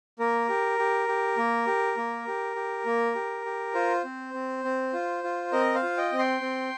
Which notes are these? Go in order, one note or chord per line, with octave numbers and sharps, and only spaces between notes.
A#3 A#4
G4
G4
G4
A#3
G4
A#3
G4
G4
A#3
G4
G4
F4 C5
C4
C4
C4
F4
F4
C4 A#4 D#5
C5 F5
F4
D#5 G5
C4
G5 C6
C4